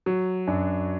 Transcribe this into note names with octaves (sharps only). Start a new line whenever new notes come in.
F#3
F#2 D4